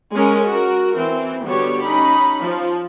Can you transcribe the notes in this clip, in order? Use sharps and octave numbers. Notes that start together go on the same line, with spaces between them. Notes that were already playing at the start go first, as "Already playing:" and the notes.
G#3 C#4 A#4
F#4 A#4
E3 C4
D3 G3 B3 F#4 G4 C#5
C#4 D#4 B5
F3